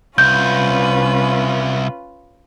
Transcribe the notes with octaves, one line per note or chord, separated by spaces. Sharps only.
C2 C#4 F4 B4 G6